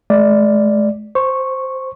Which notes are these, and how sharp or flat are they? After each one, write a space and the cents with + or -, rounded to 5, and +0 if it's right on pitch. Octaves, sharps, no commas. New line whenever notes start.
G#3 +45 D5 +0
C5 +0 C#6 -10